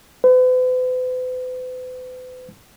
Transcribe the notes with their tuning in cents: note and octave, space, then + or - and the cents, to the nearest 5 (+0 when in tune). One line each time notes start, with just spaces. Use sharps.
B4 +45